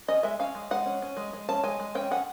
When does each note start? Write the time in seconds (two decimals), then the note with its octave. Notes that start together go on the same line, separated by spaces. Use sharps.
0.08 C#4 D#5
0.23 G#3 E5
0.39 C#4 F5
0.55 G#3
0.71 G#3 F#5
0.86 C#4
1.02 C#4
1.17 G#3
1.33 G#3
1.49 C#4 A5
1.64 G#3 G#5
1.80 G#3
1.95 C#4 G5
2.11 C#4 F#5